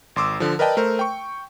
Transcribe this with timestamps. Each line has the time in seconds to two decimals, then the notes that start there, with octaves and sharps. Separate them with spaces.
0.16 G#1 C6 D6 E6
0.40 D3 F3
0.59 A#4 B4 D5 D#5 G5 A5
0.77 A3 A#4 C5
0.99 G5 C#6